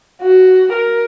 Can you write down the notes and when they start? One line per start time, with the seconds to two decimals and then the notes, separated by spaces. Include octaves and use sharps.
0.22 F#4
0.72 A#4